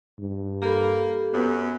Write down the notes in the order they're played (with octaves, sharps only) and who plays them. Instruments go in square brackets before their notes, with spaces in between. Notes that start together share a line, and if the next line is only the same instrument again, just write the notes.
[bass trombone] G2
[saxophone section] A#3 [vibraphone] G4 A4 B5
[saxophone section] F#2 [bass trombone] B3